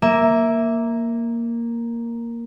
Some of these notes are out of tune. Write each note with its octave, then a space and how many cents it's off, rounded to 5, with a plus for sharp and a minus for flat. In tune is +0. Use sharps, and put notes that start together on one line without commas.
A#3 +0 E5 +0